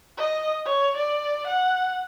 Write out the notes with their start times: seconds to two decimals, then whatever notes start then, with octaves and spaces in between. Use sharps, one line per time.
0.18 D#5
0.66 C#5
0.97 D5
1.47 F#5